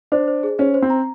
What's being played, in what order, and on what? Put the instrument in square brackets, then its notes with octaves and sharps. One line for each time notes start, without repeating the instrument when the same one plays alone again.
[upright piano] D4 [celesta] C5
[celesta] C5
G#4
[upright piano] C#4 [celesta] C5
[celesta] C5
[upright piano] C4
[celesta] A#5